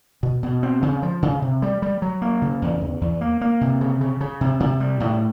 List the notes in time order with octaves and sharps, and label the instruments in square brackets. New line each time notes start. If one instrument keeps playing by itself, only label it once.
[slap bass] B2
B2
C4
C#3
F3
C#3
C3
G3
G3
F#3
A#3
C#3
E2
E2
E2
A#3
A#3
C3
C#3
C#3
C#3
C3
C3
G3
A2